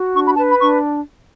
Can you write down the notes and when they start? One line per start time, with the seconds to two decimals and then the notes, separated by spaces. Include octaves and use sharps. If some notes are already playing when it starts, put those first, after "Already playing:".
Already playing: F#4
0.14 D4 C#6
0.25 B5
0.36 B4 A5
0.48 B5
0.59 D4 C#6